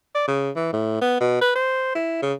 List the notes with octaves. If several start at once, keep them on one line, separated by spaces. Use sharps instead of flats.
D5
C#3
E3
A2
B3
B2
B4
C5
E4
C#3